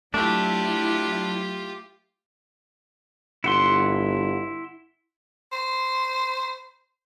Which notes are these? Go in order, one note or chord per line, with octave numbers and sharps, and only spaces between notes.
F#3 A3 D4 E4 F4 G4
G1 E4 F#5 C6
C5